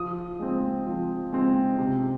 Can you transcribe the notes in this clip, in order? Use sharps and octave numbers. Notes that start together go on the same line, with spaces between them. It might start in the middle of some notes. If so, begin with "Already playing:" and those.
Already playing: F3 D#6
G#3 C4
F3
G#3 C4
C3